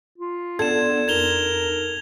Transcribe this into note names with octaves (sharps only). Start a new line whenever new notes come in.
F4
B3 D4 A4 D5 G#6 E7
F2 D#4 A#4 G#6 F7 G7